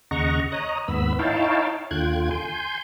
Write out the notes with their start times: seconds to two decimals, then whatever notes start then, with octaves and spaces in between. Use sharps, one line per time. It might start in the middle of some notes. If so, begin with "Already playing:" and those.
0.11 D#2 C#3 D#5 F#5 A#5 C#6
0.52 C#5 D#5 A#5 D#6 F#6
0.88 D#2 G#2 B3 B5 E6
1.19 D#4 E4 C#5 F5 G5 A5
1.91 D#2 D3 F4 G5 F#6 G#6
2.31 G#5 C6 G6